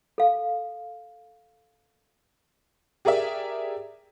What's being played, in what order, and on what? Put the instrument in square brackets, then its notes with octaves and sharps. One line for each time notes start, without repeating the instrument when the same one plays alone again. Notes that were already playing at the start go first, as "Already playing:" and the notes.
[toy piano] A4 F5
[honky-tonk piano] G4 G#4 A#4 D5 E5